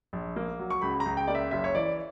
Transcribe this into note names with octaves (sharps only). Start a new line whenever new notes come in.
A#1
A#3
F#3
C#6
C#2 B5
A#5
C#2
G5
A#3 D5
E5
F#1 E5
C#5
E3 D5